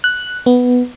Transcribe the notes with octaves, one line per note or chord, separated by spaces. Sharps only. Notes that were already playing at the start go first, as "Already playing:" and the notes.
F#6
B3